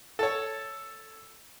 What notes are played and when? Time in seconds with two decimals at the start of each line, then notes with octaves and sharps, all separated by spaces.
0.19 A4 C#5